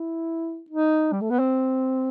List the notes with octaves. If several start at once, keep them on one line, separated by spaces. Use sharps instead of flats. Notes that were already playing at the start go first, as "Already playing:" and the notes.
Already playing: E4
D#4
G3
A3
B3
C4